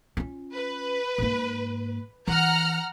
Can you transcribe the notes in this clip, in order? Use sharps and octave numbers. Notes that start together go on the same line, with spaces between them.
C#4 F4
B4
G#2 A#3
E3 F#5 A#5 F6